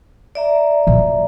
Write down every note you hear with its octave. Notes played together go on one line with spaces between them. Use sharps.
D5 E5 A#5
A#2 F#3